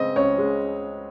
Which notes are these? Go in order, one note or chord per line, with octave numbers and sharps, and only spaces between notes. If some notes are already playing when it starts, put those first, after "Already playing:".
Already playing: C#3 G#3 C4 D#5
C#2 C#5
G#3